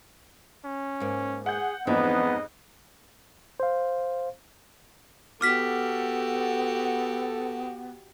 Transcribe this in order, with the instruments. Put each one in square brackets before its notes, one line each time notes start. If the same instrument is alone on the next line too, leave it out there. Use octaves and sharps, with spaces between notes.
[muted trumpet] C#4
[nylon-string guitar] G#2 A#3
[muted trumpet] G#4 [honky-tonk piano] F#5 G6
[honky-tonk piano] F2 G#2 [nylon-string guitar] E3 C4 D4 [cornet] B3 [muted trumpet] D#5
[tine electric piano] C5 F5
[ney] B3 [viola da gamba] F#4 G4 [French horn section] A4 [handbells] D6 F6 B6